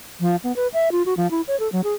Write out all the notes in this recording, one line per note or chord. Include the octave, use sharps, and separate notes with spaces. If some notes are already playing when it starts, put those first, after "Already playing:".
F3
B3
B4
E5
F4
F#4
F3
E4
C#5
A4
F#3
G#4